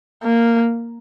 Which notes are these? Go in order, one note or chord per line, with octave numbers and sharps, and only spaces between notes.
A#3